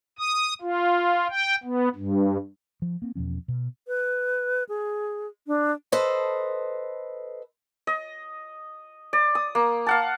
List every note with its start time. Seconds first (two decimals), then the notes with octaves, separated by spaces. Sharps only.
0.19 D#6
0.62 F4
1.30 G5
1.64 B3
1.95 G2
2.82 F3
3.02 A#3 C4
3.15 E2 B2 F3 C#4
3.48 B2
3.88 B4
4.69 G#4
5.47 D4
5.92 A4 B4 C5 D#5
7.87 D#5
9.13 D5
9.35 D#6
9.55 A#3
9.86 F5 F#5 A5